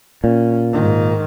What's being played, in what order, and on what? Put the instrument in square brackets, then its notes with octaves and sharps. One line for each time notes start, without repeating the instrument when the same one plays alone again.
[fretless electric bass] A#2 [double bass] C#4
[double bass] G#2 D#3